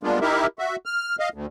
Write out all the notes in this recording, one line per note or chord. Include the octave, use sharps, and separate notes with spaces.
G3 G#3 A#3 B3 D4 F4
D#4 E4 G4 A#4 E5
F#4 E5
F6
D#5 F5
D2